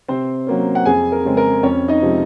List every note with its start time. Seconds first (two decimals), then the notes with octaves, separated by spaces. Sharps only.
0.08 C3 C4 C5
0.47 F#3 A#3 C#4
0.75 F#5
0.86 F2 G#4 G#5
1.12 A#4
1.25 C#3 G#3 C4
1.37 A#4
1.63 F2 C#4 C#5
1.88 D#4 D#5
2.01 C3 F3 G#3 C4